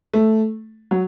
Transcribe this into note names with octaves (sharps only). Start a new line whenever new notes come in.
A3
F#3